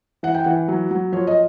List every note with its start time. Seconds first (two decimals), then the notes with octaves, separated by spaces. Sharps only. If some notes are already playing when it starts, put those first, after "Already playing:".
0.23 E3 F#5
0.34 G5
0.44 E3 F#5
0.68 F#3
0.91 F#3
1.12 F3 C#5
1.27 D#5